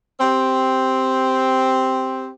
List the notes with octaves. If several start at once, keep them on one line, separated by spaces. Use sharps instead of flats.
C4 G4